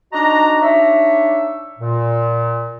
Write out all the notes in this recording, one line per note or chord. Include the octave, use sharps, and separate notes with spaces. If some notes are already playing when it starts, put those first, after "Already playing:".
D4 D#4 F#4 D#5 A#5
D4 D#4 C#5 E5
A#2